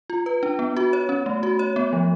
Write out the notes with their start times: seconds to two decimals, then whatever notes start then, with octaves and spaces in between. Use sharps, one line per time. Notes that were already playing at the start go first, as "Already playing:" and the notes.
0.10 F4
0.26 B4
0.43 D4
0.59 B3
0.77 F#4
0.93 C#5
1.09 C#4
1.26 A3
1.43 F#4
1.59 C#5
1.76 B3
1.93 F3